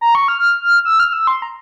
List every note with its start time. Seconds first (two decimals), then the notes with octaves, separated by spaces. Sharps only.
0.01 A#5
0.15 C#6
0.28 F6
0.85 E6
1.00 F6
1.13 E6
1.27 C6
1.42 A#5